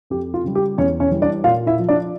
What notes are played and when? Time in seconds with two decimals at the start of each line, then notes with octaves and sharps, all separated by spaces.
0.10 F2 G4
0.34 F4
0.44 C#3 G3
0.55 G4
0.78 E2 C#4 C#5
1.00 C#4 C#5
1.11 E3 G3
1.22 D4 D5
1.44 A#2 F4 F5
1.67 E4 E5
1.78 F3
1.89 D4 D5